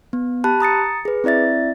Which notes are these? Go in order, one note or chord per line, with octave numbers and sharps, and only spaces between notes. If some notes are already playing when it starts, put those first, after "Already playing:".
B3
G4 A5 B5 F#6
A#5 D#6 A6 C#7
G#4 B4
C4 E4 D5 E5 A6